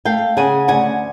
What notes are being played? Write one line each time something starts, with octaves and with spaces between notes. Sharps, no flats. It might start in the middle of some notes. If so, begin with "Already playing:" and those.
A3 F5 G5
C#3 F#5 G#5
D2 F#5 G#5